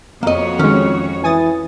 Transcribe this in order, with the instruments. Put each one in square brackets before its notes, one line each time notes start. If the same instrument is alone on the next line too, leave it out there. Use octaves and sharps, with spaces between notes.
[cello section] F2 F#4 C#5 [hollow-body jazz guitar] A#3 D#5
[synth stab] D#3 G#3 [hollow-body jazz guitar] C#4
[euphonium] E3 [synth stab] G#5 D#6 A6